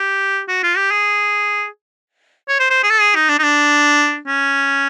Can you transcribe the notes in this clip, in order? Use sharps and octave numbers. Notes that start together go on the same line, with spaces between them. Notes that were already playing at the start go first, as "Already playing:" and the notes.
Already playing: G4
F#4
F4
G4
G#4
C#5
C5
C5
G#4
A4
G#4
D#4
D4
D#4
D4
C#4